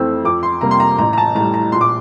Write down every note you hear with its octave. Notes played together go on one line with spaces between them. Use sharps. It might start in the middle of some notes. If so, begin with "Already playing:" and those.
Already playing: F2 E3 A3 C4 E6
F2 D6
C6
C3 G3 A#3 A#5
C6
A#5
A1 A#5
A#5
A5
A2 G3 A#5
A#5
A#1 C6
D6